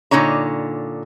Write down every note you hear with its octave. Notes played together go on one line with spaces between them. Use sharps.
A#2 D3 D#4 C#5 A#5